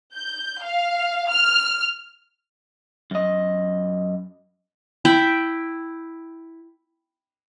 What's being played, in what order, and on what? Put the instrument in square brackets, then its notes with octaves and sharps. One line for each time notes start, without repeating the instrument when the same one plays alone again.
[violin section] G6
F5
F6
[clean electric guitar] F#2 D#5
[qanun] E4 G5 B5